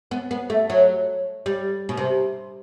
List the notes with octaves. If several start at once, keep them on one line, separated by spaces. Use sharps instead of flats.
B3
B3
A3
F#3
G3
B2
C3